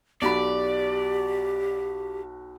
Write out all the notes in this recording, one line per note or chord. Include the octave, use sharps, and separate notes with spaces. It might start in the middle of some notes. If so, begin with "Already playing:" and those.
B1 F#4 G4 D5 B5